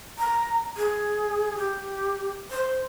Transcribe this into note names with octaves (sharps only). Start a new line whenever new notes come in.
A#5
G#4
G4
C5